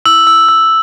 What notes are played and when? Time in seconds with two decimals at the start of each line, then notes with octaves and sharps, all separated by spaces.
0.05 E6 F#7
0.27 E6
0.49 E6